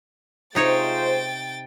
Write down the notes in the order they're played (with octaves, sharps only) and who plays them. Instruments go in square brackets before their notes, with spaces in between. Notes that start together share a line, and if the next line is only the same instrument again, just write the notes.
[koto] C3 D#4 C#5 [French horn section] G#3 F4 C5 [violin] G5 A6